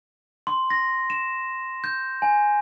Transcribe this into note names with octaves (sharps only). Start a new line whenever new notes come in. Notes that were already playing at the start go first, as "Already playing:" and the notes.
C6
A#6
E7
G6
G#5